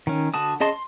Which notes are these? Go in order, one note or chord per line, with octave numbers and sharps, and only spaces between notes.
D#3 C#4
D3 F#4 A5 D#6
C#4 G#4 D#5 A5 C6
C6